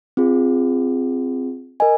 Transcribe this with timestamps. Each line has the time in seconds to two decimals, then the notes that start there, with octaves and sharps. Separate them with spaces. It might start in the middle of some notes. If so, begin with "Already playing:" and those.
0.17 C4 F4 G#4
1.80 A#4 D#5 G#5